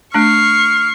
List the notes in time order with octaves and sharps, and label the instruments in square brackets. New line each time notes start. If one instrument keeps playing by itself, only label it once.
[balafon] A3 D4 [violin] C#6 C7 [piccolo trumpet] F6